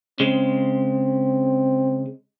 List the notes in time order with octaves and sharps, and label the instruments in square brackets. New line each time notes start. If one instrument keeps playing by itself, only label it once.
[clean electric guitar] C#3 G#3 [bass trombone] C4